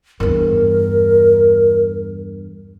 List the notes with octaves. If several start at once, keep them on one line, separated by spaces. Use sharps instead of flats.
E2 G2 A#4